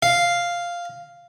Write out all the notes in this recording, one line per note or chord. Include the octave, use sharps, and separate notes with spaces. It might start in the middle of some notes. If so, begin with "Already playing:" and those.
F5